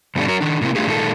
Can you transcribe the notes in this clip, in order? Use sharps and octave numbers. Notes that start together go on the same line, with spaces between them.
G2 B2 D3 G3 A3 D4
F#3 F#4 A#4
D#3 D4
A2 C3 A#3 C4 E4
A3 D4 F4 G4 G#4
A#2 D#3 G#3 A#3 A4